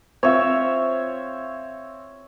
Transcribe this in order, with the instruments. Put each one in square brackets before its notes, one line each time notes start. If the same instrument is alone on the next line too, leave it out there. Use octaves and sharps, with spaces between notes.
[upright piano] C4 F4 [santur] C#5 E5